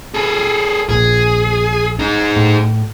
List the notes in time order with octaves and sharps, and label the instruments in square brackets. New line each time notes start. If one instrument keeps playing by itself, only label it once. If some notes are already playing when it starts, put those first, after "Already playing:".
[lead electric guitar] G#4 A4
[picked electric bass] A#1 [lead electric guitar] G#4
[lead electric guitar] D#4 G#4
[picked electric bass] A2